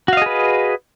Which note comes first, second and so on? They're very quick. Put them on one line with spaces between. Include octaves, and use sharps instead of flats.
F#4 F5 D#5 G#4 B4